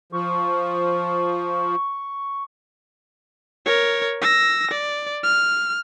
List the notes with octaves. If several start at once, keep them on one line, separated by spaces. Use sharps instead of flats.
F3 C#6
A#4 C#5
E6 A#6
D5
F6